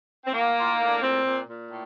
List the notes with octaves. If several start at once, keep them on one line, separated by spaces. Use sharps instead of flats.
C4
A2 A#3
A2 F4
A2 D#4
D4
A#2 C4
A#2
A#2
A2